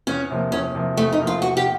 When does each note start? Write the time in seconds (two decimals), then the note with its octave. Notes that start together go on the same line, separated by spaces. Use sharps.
0.07 E2 C#4
0.31 C3 F3 A#3
0.52 E2 C#4
0.75 C3 F3 A#3
0.97 E2 A3
1.13 D#4
1.20 C3 F3 A#3
1.27 F4
1.42 E2 F#4
1.57 G4